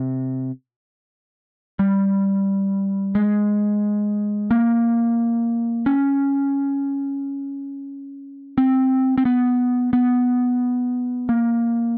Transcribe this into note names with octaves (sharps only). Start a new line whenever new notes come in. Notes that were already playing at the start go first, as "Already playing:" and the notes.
Already playing: C3
G3
G#3
A#3
C#4
C4
C4
B3
B3
A#3